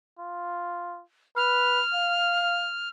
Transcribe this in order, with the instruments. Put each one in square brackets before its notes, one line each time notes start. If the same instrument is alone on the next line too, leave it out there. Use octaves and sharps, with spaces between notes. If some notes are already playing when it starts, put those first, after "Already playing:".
[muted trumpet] F4
[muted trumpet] B4 [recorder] F6
[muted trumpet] F5